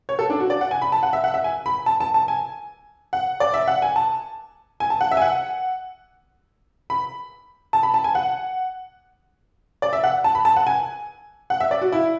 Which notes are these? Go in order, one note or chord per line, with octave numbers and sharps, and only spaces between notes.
C#5
A4
D4
F#4
D5
F#5
G#5
B5
A5
F#5
E5
F#5
E5
G#5
B5
A5
A5
A5
G#5
F#5
D5
E5
F#5
G#5
A5
G#5
A5
F#5
E5
G#5
F#5
B5
A5
B5
A5
G#5
F#5
D5
E5
F#5
A5
B5
A5
F#5
G#5
F#5
E5
D5
F#4
E4